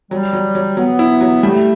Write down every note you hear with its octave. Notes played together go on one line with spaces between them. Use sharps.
F#3 G3
F#3
F#3
F#3 B3
E4
F#3
G3 A3